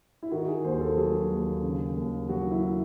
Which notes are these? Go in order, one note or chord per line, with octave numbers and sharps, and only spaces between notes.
E4
D#3 F#4
G#4
D#2 C5
A4
F#3 G#4
D#2
C#3
D#2
F#3 F#4
E4